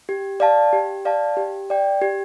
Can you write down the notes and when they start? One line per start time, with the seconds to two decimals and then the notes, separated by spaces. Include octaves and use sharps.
0.09 G4
0.40 D5 F5 A5
0.73 G4
1.05 D5 F5 A5
1.37 G4
1.70 D5 G5
2.02 G4